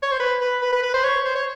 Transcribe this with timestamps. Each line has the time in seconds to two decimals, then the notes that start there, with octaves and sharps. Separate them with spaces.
0.03 C#5
0.12 C5
0.20 B4
0.41 B4
0.62 B4
0.72 B4
0.83 B4
0.94 C5
1.04 C#5
1.25 C5
1.35 C#5